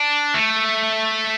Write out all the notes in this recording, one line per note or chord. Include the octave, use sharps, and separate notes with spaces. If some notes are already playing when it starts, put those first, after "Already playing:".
Already playing: D4
A3